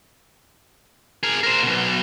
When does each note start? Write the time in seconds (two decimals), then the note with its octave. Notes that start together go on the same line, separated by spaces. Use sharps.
1.23 G#4 A#4
1.43 A#4 C5
1.63 B1 B2